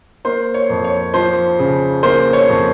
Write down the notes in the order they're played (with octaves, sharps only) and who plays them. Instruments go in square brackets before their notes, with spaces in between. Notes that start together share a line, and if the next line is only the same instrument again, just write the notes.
[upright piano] A#3 C5
C#5
F2
C#5
F3 C5
C#3
A#3 C5
C#5
F2